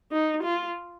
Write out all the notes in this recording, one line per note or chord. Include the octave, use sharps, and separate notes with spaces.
D#4
F4